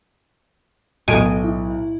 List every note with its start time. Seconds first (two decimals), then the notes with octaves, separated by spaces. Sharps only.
1.08 B1 A2 D#5 G#5 D7
1.44 E4